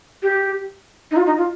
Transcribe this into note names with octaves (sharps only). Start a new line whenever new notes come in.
G4
D#4
F4
D#4
F4